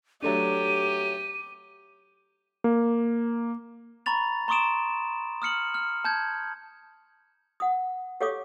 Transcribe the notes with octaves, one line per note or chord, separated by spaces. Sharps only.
F#3 A3 D4 G4 D#7
A#3
A#5 B5 C#6 A6 F7
A#5 C6 C#6 D#6 D7 E7
D#6 F6 C#7 F#7
F6
A5 G6 G#6
F#5 D#6
G4 A4 C#5 F5 D6 D#6